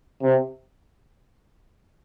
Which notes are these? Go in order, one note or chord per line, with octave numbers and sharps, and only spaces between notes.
C3